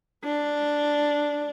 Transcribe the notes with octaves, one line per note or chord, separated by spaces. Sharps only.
D4